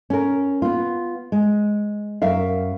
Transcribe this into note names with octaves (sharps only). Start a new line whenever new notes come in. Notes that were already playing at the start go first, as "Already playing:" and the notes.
C#4 A#4
B3 F4
G#3
F#2 A#4 E5 F5